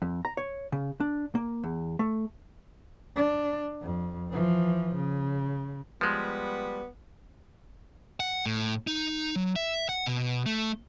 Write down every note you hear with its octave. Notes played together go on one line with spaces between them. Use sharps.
F2
A#5
C#5
C#3
D4
A#3
E2
A3
D4
F2
E3 F3
C#3
F3 G3 G#3 B3
F#5
A2
D#4
F#3
E5
F#5
B2
A3